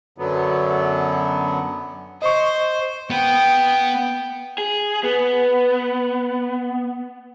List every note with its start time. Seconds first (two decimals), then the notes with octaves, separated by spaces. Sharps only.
0.18 F#2 D3 F#3 B3
2.22 C5 D#5 C#6
3.10 B3 G5
4.58 G#4
5.03 B3